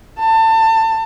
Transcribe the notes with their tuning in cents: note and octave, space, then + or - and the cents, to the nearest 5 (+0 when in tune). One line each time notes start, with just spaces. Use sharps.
A5 +25